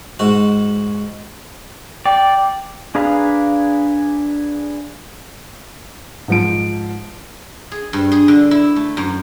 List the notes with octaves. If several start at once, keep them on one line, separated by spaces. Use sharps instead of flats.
G#2 F#4
D5 G5
D4 G#4 B4 F5 A#5
G#2 F3 D7
G#4
G2
G#4
D3
E4
A3
F#2